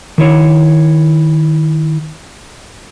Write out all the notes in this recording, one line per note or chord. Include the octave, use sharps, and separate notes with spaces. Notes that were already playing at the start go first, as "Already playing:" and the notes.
D#3 E4 C#5